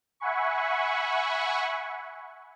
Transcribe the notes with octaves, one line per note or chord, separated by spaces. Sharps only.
E5 F#5 G#5 B5 C#6